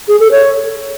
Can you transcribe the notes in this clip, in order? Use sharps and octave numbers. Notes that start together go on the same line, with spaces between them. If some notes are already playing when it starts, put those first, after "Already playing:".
G#4
A4
C#5